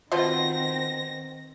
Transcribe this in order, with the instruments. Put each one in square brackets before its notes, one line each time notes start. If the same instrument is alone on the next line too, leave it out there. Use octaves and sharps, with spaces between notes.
[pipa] B2 F4 C5 [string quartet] D#3 C4 A#6